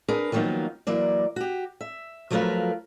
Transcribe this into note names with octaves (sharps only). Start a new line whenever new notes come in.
D4 G#4 A#4 B4
D#3 F3 F#3 A#3 B3 D#4
E3 F#3 A#3 D5
F#4 G4
E5
F3 F#3 A3 F4 A#4 B4